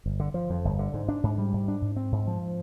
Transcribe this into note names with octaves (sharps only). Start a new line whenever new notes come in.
G1
D3
F3
F2
G1
D3
G#2
D4
G#2
G3
G#2
D4
G#2
C4
G#2
F3